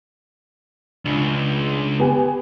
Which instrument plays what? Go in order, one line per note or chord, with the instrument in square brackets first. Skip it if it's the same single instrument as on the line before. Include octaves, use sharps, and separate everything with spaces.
[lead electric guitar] C#2 [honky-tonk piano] D4
[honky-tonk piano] B3 G4 G#5